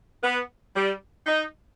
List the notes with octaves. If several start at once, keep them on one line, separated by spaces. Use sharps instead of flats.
B3
G3
D#4